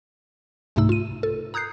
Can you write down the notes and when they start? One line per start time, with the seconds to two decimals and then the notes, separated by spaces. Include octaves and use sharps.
0.76 C2 G#2 C3 A3 D#4 E6
0.89 F4 D#7
1.23 A4
1.54 A#5 D#6 F#6 G6 C7